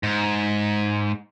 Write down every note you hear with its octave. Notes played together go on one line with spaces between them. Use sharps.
G#2